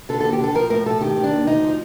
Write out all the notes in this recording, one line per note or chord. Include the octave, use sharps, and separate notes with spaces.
D3 A4
D#2 A4
G4
D3 A4
F3 A#4
A2 A#4
A2 A4
D#3 G4
D#3
D4
D#2
D2 D#4
F3